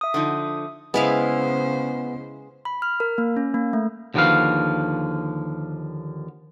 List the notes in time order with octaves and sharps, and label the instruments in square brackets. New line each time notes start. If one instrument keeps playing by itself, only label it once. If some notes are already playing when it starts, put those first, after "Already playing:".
[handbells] E5 D#6
[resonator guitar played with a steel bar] D3 F3 D#4
[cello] C#3 C5 [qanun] G#3 E4 F5 [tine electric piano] B3
[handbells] B5
F6
A#4
A#3
C#4
A#3
A3
[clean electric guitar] D#2 D3 F3 F#4 B4 F5